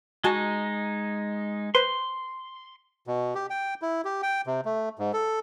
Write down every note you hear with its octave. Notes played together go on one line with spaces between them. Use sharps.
G#3 D#4 F#4 G#5 A5
B4 C5 C6
B2
G4
G5
E4
G4
G5
C3
A3
G#2
A4